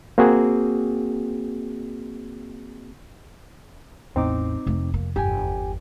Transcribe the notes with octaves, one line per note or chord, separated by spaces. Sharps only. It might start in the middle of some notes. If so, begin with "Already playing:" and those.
A#3 C4 F#4 G#4
A1 E2 C4 D#4 D6
F1 A3 A#3
A#3
G1 E2 G4 G5 G#5